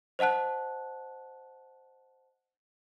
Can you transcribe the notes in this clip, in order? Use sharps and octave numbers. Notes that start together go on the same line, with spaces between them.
C5 D#5 F#5 A5 F#6